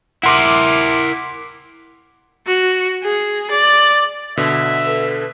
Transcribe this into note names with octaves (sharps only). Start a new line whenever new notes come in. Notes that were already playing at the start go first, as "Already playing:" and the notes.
E4 A#4 F#5 C6 D6
F#4
G#4
D5
B2 D3 E5
A4 B4